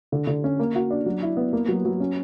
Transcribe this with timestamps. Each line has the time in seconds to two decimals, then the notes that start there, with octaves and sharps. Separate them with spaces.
0.12 D3
0.27 D3
0.44 C#4
0.59 A#3
0.75 F#4
0.90 D4
1.06 F#3
1.22 E4
1.37 B3
1.53 A#3
1.68 F#3
1.85 F#3
2.00 C#4